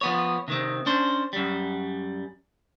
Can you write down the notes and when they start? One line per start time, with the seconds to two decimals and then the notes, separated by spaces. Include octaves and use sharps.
0.01 F3 B3 C#5
0.48 C3 D#3 C4
0.86 C#4 D4 C5
1.33 F#2 G3